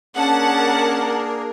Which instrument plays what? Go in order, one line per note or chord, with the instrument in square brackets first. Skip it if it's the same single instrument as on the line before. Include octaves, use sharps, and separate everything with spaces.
[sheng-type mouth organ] A#3 D4 G#4 [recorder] C#4 [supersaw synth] A#4 [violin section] F#5 A5